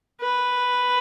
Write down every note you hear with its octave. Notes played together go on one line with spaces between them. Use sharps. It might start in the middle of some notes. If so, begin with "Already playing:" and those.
B4